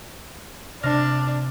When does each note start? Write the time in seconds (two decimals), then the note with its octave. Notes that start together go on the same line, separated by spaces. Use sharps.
0.83 C3 D4 F6 A#6